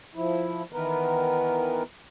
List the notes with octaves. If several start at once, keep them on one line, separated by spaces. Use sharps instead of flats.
F3 E4
D#3 E3 B3 A#4 B4